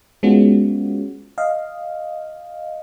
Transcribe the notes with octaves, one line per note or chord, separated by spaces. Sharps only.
G#3 B3 C#4 F4 F#4
D#5 F5